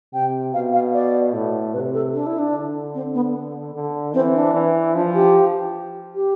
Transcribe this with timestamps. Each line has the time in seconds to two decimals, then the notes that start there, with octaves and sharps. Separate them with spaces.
0.13 C3 G5
0.54 B2 F5
0.73 F5
0.93 D5
1.33 A2
1.73 C3 B4
1.94 A4
2.14 D4
2.26 E4
2.38 D4
2.54 D3
2.94 C4
3.14 B3
3.74 D3
4.14 E3 C4
4.34 D4
4.54 E3
4.94 F3 D4
5.14 G4
6.15 G4